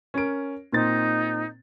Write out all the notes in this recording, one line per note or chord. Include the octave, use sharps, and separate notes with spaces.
C#4 A#4 D7
A#2 C4 D#4 A6